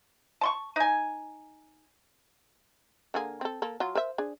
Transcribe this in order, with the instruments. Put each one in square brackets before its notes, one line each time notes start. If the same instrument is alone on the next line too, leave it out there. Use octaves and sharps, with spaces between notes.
[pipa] A5 C6 C#6
D#4 G#5
[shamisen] D3 A#3 G#4
C4 A4
A#3 A4
F#3 F4
A#4 C5 E5
D4 G#4